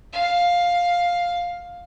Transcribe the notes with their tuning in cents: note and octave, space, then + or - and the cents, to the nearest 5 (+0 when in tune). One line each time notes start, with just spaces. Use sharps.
F5 +10